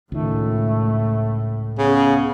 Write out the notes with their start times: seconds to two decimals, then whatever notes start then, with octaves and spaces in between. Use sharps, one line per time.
0.12 C#2 A2 D#3 A3
1.78 C#3 B3